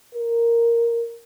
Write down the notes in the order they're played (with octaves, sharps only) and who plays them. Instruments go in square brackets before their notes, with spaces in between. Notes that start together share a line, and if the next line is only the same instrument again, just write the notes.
[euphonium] A#4